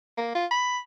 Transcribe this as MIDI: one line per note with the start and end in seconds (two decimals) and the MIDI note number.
0.17 0.34 58
0.35 0.46 65
0.51 0.78 83